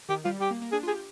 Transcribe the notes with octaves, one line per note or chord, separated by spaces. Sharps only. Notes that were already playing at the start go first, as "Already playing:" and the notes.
D#3 G4
G3 F4
G3 G4
A#3
A#3
D4 G#4
F4
G4 G#4